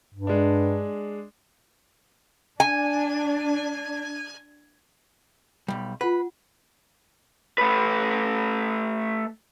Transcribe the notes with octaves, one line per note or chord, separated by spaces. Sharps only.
G2
G#3 D4
D4 G#5
B1 G3
F4 B4 F#5
A3 B4